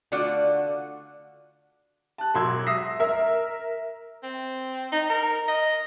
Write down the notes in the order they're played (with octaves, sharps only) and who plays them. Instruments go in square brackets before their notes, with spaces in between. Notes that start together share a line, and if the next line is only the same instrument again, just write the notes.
[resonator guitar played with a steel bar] D3 A3 F4 F#4 D5 F#5
[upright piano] A5 F#6
E1 F#3 C6 E6 G#6
E5 D#6 E6 A#6 C7
[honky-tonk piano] A#4 E5
[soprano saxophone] C4
D#4
A#4
D#5